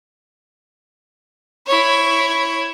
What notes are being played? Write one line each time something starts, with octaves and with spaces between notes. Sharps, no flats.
E4 C#5